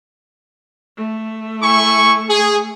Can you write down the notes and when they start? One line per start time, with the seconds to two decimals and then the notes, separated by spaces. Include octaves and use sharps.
0.98 A3
1.63 E4 G#5 C#6
2.29 G#4